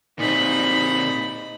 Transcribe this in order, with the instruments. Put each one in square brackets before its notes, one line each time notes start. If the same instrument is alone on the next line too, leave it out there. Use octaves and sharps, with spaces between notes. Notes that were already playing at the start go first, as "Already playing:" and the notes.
[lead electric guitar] A#2 C4 [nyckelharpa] D#4 B5